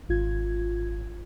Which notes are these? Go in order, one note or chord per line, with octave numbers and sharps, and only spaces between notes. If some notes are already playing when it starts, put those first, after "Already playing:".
G#1 F4 G#6